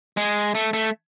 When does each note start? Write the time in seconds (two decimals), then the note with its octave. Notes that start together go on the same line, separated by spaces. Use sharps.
0.17 G#3
0.55 A3
0.73 A3